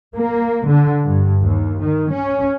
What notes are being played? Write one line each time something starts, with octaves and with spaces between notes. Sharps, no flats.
A#3
D3
G2
D#2
D#3
C#4